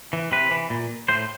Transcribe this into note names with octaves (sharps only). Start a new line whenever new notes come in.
E3
C3 B4
E3
A#2
A2 C5